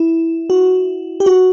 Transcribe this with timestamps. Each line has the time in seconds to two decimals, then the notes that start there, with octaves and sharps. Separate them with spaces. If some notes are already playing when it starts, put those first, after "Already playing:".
Already playing: E4
0.50 F#4
1.20 G4
1.26 F#4